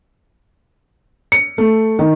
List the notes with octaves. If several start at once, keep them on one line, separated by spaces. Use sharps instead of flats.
C#7
A3
D#3